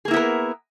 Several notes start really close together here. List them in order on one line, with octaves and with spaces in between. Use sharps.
G#4 A#3 E4 B3 A#4